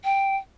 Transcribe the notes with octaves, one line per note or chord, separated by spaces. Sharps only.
G5